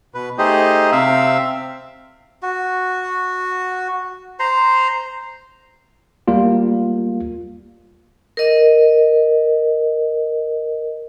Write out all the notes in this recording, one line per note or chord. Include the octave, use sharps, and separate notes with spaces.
B2 B4
A3 D#4 G4 G#4 C5 D#5
C3 C4 E5 F5 E6
F#4
C5 A#5 C6
G3 A#3 F4
A#4 D#5